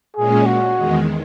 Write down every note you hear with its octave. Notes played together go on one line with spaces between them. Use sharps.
A#2 G#3 C#4 G#4
F#4
E2 D#3 G#3